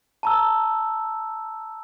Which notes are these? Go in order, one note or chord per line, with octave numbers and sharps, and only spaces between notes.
A5 A#5 E6